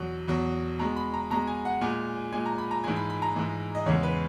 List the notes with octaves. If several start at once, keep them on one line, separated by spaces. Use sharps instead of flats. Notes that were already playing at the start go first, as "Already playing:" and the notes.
Already playing: E2 B2 F#3
E2 B2 F#3
B2 G#3 A#5
B5
A#5
B2 G#3 A#5
G#5
F#5
A#2 G#3 G#5
A#2 G#3 G#5
A#5
B5
A#5
G#2 E3 G#3 G#5
B5
B5
A#5
G#2 E3 G#3
D#5
E2 C#3 E3 G#3 C#5
B4